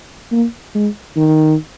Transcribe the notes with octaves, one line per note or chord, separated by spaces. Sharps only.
A#3
G#3
D#3